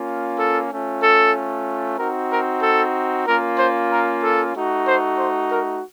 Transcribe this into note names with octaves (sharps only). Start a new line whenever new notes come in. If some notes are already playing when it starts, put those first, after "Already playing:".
Already playing: A#3 C#4 F4
A4
A3 C#4 F4
A4
C4 D#4 F#4 A#4
A#4
A4
A#3 C#4 F4 A#4
C5
A#4
A4
A3 D#4 F#4
C5
C5
A#4